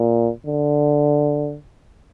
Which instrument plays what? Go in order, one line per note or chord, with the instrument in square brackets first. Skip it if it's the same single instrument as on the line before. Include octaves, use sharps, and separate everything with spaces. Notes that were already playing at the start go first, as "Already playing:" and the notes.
Already playing: [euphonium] A#2
D3